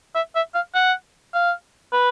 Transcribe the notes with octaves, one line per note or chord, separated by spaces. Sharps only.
E5
E5
F5
F#5
F5
B4